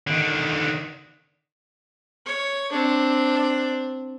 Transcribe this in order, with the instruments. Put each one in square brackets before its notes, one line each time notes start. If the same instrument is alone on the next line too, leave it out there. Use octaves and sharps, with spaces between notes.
[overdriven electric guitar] D3 D#3
[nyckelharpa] C#5
C4 D4